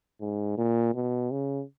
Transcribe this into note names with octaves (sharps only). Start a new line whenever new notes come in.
G#2
A#2
B2
C#3